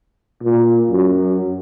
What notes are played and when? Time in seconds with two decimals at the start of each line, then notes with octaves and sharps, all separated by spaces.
0.43 A#2
0.91 F#2